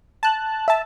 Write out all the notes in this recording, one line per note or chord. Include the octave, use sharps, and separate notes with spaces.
A5 F#6
E5 A5